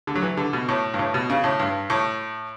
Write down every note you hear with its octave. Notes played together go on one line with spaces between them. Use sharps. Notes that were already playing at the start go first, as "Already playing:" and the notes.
D3
F#3
E3
D3
B2
A2
G2
A2
B2
C#3
A2
G2
A2